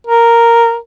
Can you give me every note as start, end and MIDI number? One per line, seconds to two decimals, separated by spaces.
0.07 0.77 70